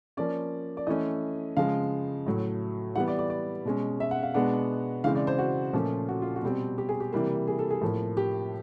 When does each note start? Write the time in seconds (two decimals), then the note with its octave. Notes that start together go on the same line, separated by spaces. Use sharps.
0.17 F3 A#3 C#4 D5
0.77 D5
0.87 E3 A3 C#4 D#5
1.57 C#3 F3 G#3 F5
2.26 A2 F#3 A3
2.95 E3 G3 B3 F#5
3.08 D5
3.19 D5
3.30 D5
3.65 B2 G#3 C#4
4.00 E5
4.11 F#5
4.23 F5
4.34 B2 G#3 B3 D4 F#5
5.04 C#3 E3 G#3 C4 F5
5.15 D5
5.27 C5
5.39 F#4
5.73 A#2 F3 A3 C#4
6.09 F#4
6.22 F4
6.36 F#4
6.43 B2 G3 C4
6.78 G4
6.89 G#4
7.00 G4
7.13 C3 E3 G3 A#3
7.47 G#4
7.59 A4
7.71 G#4
7.81 A2 F3 A#3
8.17 G4